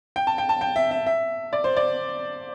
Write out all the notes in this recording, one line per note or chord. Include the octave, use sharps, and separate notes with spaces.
G5
A5
G5
A5
G5
E5
E5
E5
D5
C5
D5